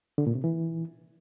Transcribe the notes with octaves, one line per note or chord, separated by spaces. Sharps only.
D3
A#2
C3
E3